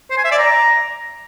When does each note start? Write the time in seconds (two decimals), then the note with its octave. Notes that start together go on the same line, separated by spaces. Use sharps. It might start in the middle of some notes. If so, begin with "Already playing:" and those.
0.11 C5
0.18 G#5
0.25 E5
0.32 D5
0.39 A#5